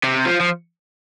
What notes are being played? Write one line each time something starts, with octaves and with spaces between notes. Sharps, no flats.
C3
F3
F3